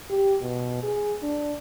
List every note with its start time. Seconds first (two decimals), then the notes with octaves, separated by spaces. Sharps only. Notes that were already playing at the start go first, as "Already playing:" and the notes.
0.10 G4
0.42 B2
0.83 G#4
1.23 D4